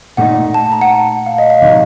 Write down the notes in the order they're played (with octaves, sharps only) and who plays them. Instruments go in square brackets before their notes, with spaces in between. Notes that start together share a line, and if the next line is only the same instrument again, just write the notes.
[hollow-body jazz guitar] A#2 A3 D#4 [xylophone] F#5
[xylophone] A5
A#5
F#5
A5
F5
D#5
F5
[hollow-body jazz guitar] C3 D#3 F#3 [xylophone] D#5